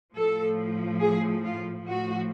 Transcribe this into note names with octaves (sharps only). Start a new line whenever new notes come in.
A2 F3 A4
G#4
F4
A2 F3 F#4